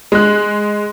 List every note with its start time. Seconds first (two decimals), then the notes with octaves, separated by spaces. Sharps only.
0.12 G#3 F#6